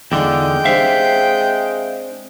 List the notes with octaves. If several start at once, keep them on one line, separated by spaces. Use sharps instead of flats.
E2 D3 G#3 D4 D#4 F4 G5
C4 D4 G4 E5 F5